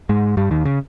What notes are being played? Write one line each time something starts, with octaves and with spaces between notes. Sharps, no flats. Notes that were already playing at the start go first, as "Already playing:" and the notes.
G#2 G#3
G2 G3
D#2 D#3
C#3